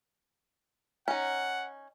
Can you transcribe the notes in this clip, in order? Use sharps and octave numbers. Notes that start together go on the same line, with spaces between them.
C#4 D#4 F#5